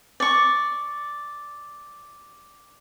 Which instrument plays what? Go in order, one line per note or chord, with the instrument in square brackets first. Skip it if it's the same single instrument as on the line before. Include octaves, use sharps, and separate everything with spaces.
[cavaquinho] D5 C#6